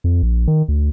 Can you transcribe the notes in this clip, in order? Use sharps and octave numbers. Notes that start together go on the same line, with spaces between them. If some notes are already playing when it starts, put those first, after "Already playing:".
F2
A#1
D#3
D2